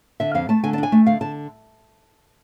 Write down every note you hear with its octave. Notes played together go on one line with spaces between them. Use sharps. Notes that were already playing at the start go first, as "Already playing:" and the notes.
D3 E5
F2 F5
A3 A5
D3 G#5
A5
D4 G#5
A3
D3 F5
D3 A5